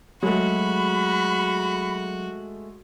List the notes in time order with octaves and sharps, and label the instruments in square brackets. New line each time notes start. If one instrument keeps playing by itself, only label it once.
[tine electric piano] F#3 G#4 [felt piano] G#3 A3 [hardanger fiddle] F#4 [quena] B5